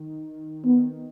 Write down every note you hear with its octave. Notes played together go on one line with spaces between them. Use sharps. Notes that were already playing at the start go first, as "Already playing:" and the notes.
Already playing: D#3
D#3 B3